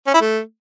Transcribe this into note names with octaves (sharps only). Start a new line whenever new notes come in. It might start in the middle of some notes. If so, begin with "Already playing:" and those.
C#4
E4
A3